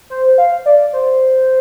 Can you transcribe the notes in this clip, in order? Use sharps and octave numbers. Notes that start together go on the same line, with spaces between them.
C5
F5
D5
C5